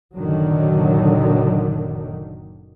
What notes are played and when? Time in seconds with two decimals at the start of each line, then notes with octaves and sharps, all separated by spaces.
0.15 F#1 A#2 D3 D#3 F#3